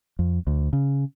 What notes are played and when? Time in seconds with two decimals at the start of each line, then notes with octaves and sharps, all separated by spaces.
0.19 F2
0.47 D2
0.73 C#3